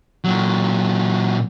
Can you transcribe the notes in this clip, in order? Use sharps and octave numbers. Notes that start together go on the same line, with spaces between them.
A#2 F#3